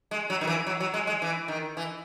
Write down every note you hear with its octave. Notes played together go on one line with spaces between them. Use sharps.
G#3
F#3
D#3
E3
F#3
F#3
G#3
G#3
E3
D#3
E3